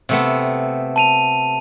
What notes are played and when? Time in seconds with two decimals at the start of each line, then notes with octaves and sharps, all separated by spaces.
0.09 C3 A3 B3
0.96 A5 D#7 F7